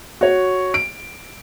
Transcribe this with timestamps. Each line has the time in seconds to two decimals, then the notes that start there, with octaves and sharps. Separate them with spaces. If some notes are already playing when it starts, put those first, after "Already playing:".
0.21 F#4 C#5
0.74 D7